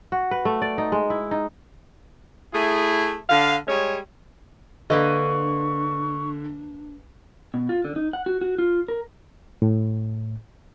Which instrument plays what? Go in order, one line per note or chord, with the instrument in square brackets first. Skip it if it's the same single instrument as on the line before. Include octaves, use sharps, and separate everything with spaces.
[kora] F#4
B4
A3
D5
D#4
G#3
E4
D#4
[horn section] A3 E4 G#4
D3 F5
G3 G#3 G#4 C#5
[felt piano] D3 [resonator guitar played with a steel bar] A#3 B4 D#5 [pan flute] D4 [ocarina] C#6
[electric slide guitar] B2
F4
D3
D#4
F#5
F#4
F#4
F4
A#4
[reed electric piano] A2